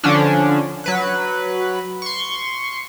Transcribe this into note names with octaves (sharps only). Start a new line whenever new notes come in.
D3 F3 C#4 D4
F#3 B4 F#6
C6 C#6